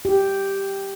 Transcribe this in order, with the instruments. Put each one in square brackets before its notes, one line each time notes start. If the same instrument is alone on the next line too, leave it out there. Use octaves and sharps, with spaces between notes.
[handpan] G4